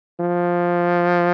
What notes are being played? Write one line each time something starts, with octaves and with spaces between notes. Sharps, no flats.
F3